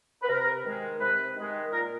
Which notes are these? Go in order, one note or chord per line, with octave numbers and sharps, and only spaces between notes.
B4
C3 A#4
D#3 G#3
C3 B4
D#3 G#3
A#2 A#4